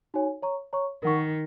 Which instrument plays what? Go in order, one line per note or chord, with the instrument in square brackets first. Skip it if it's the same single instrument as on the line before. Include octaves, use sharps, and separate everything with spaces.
[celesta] D#4 F#4 C#5 G#5
C#5 A#5 C#6
C#5 A#5 C#6
[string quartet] D#3 [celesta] A#4 F#5 C#6